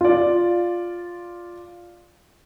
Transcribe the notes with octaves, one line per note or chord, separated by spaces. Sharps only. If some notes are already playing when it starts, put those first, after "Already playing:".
F4 D5